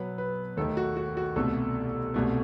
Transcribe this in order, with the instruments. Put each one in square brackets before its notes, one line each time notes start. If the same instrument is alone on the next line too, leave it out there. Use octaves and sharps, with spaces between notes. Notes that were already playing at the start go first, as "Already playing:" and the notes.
Already playing: [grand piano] B2 F#3 B3 B4
B4
D#2 D#3 A3 A4
F#4
F#4
F#4
C2 B2 A3 A4
C2 B2 A3